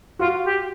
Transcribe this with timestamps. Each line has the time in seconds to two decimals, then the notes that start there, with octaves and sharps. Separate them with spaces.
0.19 F4 F#4
0.45 G4